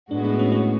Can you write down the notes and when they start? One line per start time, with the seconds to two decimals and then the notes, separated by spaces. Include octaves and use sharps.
0.11 A2 G#3 B3 D4 F#4
0.24 D4
0.39 C#4
0.52 C#4